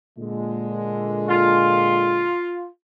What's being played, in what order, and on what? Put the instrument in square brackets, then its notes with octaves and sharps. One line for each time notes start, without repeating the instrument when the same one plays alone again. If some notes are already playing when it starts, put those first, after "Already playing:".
[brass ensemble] A#2 D3 G#3
[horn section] F4